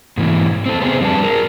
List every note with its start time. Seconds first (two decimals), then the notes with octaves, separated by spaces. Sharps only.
0.17 G#2 B2 E3
0.66 C4 A4
0.80 B3 C4 G#4
1.01 F2 G3 D4 F#4 B4 A5
1.23 G#4 A#4